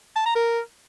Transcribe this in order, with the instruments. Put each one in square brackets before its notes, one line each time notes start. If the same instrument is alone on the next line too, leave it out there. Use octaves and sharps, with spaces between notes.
[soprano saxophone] A5
A#5
A#4